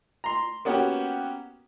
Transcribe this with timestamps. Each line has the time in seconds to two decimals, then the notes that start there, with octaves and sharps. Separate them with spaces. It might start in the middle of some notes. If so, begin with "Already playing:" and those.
0.24 A#5 C6
0.65 A#3 B3 C#4 F#4 G4